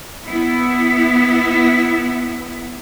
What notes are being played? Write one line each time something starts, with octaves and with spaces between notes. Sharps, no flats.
B3 E4